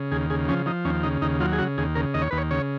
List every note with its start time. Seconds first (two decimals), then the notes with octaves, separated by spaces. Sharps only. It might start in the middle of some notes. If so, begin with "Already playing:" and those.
Already playing: C#3
0.12 D#2 G#4
0.30 C#3 G#4
0.48 F3 C#4
0.66 F3 D#4
0.85 D#2 C#4
1.03 C#3 D#4
1.22 D#2 D#4
1.40 F#3 F4
1.53 G#4
1.59 C#3 F#4
1.78 D#2 G#4
1.95 C#3 A#4
2.14 D#2 D#5
2.22 C#5
2.31 D#2 B4
2.38 C#5
2.51 C#3 C#5